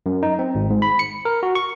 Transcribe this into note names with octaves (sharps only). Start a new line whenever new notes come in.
F#2
D#4
C4
G#1
G#2
B5
C#7
A#4
F#4
C#6